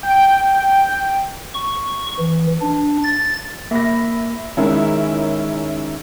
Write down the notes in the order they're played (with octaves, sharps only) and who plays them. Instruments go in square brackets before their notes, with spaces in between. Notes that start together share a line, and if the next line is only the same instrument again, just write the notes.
[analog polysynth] G5
[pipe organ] C#6
E3
D4
A6
[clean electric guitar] A#3 [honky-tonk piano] E5 B5 A#6
[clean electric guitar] D#3 G#3 [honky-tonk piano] C#4 E4 A#4